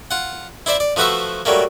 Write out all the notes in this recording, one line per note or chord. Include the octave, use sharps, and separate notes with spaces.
F4 F#5
E4 C5 D5 E5
D5
F3 A3 F#4 B4 C5 E5
F#3 G3 A3 A#3